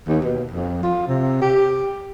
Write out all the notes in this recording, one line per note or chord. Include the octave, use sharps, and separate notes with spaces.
D#2
B2
F2
F4
C3
G4